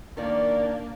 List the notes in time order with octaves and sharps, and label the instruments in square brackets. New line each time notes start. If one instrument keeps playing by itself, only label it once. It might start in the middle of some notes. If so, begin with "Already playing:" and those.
[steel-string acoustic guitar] D#3 D5 [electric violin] A#3 D4